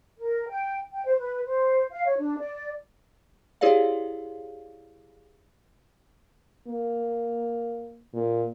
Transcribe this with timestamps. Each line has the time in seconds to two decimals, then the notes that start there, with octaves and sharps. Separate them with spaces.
0.18 A#4
0.49 G5
0.92 G5
1.05 C5
1.18 B4
1.46 C5
1.91 F5
2.06 C#5
2.18 D4
2.38 D5
3.61 E4 G4 G#4 C#5 D5 F5
6.67 A#3
8.14 A#2